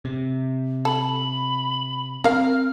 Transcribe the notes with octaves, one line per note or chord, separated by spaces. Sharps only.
C3
A4 B5
C4 A#4 F5 F6